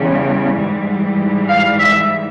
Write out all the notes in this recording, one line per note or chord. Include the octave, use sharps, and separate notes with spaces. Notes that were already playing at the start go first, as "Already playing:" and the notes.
Already playing: E2 C#3 G3
G#2 E3 G3
F5
E5